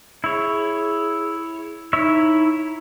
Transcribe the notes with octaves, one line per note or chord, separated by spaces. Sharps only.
E4 G#4 C#5
D#4 E4 C#5 E5